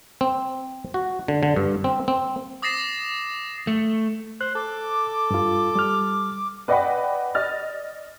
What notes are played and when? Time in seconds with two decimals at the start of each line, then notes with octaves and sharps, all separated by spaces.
0.21 C4
0.94 F#4
1.28 D3
1.43 D3
1.56 G2
1.84 C4
2.08 C4
2.62 D6 D#6 A6 A#6 C7 E7
3.67 A3
4.41 C5 F#6
4.55 A4 D6
5.31 G2 F4
5.75 G3 F6
6.68 B4 D5 D#5 F#5 G5 B5
7.35 D5 D#5 F6 A6